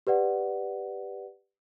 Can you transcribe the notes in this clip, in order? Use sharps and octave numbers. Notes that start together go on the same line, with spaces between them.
G4 B4 D5 F#5